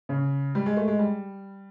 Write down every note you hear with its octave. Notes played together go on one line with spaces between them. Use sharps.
C#3
G3
G#3
A3
G#3
G3